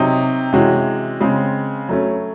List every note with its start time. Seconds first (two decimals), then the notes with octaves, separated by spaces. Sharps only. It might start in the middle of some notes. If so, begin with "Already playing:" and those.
Already playing: C3 F#3 C4 D#4
0.53 C3 E3 G#3 C#4 F#4
1.21 C#3 G#3 C4
1.89 F#3 A3 C#4